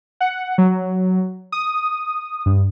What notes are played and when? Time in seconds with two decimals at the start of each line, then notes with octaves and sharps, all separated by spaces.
0.21 F#5
0.58 F#3
1.52 D#6
2.46 G2